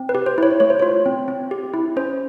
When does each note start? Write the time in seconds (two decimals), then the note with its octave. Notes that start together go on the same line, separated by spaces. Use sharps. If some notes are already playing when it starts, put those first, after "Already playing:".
Already playing: C4
0.09 B4
0.15 G4
0.26 C5
0.38 E4 C#5
0.60 A3 C#5
0.70 C5
0.80 F4 C#5
1.06 C4
1.28 C4
1.51 G4
1.74 E4
1.96 C#4 C5